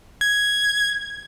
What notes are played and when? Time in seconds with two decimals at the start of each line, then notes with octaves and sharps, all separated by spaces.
0.21 G#6